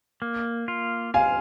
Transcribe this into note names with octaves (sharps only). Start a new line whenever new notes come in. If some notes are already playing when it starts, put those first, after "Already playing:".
A#3
F4
F4 F5 G#5